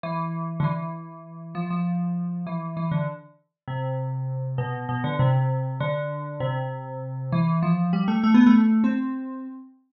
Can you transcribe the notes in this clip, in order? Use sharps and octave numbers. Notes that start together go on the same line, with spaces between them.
E3
D3
E3
F3
F3
E3
E3
D3
C3
B2
B2
D3
C3
D3
C3
E3
F3
G3
A3
A3
B3
A3
C4